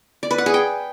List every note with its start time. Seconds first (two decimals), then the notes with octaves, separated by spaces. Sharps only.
0.23 D5
0.31 B4
0.38 F#5
0.46 G#4
0.54 G5